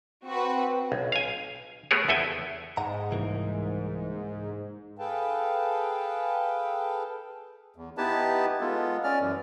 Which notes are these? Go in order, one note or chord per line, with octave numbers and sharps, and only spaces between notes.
C4 F#4 B4
B1
F5 G#5
A3 B3 G4 G#4 A#4 C#5
E2 E4 A4 G#5
G#2 F#5 A#5
C2 E3 A#3
G#4 A4 B4 F5 G5 A5
E2
B3 D#4 E4 G4 B4 A5
G#3 B3 F4 A4
C#4 D5 F6
F#2 E3